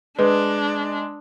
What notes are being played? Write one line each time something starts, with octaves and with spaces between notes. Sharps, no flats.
G#3 D4 B4